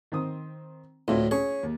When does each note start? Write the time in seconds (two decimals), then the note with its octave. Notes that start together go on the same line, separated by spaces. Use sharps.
0.12 D#3 C4 D#6
1.08 D2 A2 A3 E4 F4
1.31 C#4 G#4 C#5
1.63 D#2